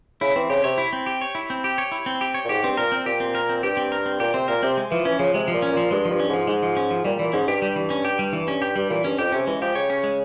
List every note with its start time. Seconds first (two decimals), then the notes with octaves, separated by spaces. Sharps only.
0.21 C#3 E4
0.35 E3 C4
0.50 C#3 G4
0.64 C3 C#5
0.78 E4
0.93 C4
1.06 G4
1.21 C#5
1.35 E4
1.50 C4
1.64 G4
1.78 C#5
1.92 E4
2.06 C4
2.21 G4
2.34 C#5
2.45 A#2
2.49 G#2 G4
2.63 G2 C4
2.77 A#2 A#4
2.92 C4
3.06 A#2 G4
3.20 C4
3.35 A#4
3.49 C4
3.63 G2 G4
3.77 C4
3.92 A#4
4.06 C4
4.20 A#2 G4
4.34 C3 C4
4.48 A#2 A#4
4.63 C3 C4
4.77 G#3
4.91 E3 F3
5.05 E3 C#4
5.19 C#3 F3
5.34 C3 G#3
5.48 F3
5.54 A#2
5.62 C#4
5.72 A#2
5.77 F3
5.91 G2 G#3
6.05 F3
6.10 G2
6.20 C#4
6.29 G#2 F3
6.47 G#2 G#3
6.63 F3
6.77 C#4
6.91 F3
7.05 A#2 G3
7.19 A#2 E3
7.33 G#2 C#4
7.47 G2 G4
7.62 G3
7.76 E3
7.90 C#4
8.05 G4
8.19 G3
8.33 E3
8.48 C#4
8.62 G4
8.76 G2 G3
8.90 A#2 E3
9.04 G2 C#4
9.19 F2 G4
9.32 C3 C#4
9.47 E3 G#3
9.61 F3 G4
9.75 C#3 C#5
9.90 C#4
10.04 G#3